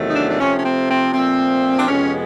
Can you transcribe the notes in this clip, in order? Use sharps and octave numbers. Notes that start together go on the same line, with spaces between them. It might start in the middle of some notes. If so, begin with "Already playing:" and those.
Already playing: E2 C3 D#3 F#3 A3
D#4
D4
D4
C3 F3 A3 C#4
C#4
C4
C4
A#2 F3 A3 C4
D4
F2 C3 F3 G#3 B3 C#4